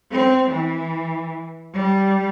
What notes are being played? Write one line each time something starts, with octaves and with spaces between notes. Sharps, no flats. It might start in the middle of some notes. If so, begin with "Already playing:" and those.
C4
E3
G3